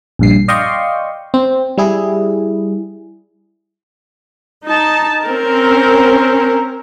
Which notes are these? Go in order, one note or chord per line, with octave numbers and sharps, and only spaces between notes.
A#1 G2 C7
D5 D#5 F5 G5 C6 C#6
C4
G3 E4 G#4
D#4 A5
C4 C#4 A#4